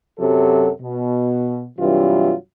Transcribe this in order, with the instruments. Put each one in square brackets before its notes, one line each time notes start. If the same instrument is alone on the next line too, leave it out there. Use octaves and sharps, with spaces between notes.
[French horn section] F#2 C3 F#3 A4
B2
G2 C3 E3 F#3 F4